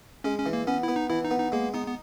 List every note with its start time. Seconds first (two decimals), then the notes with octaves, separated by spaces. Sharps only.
0.24 G#3 C#4
0.39 C#4
0.46 E3
0.53 A#3
0.67 B3 C#4
0.83 B3 E4
0.96 D#4
1.10 E3 E4
1.25 D#4
1.31 B3
1.39 D#4
1.52 G#3 A#3
1.74 B3 D#4
1.87 B3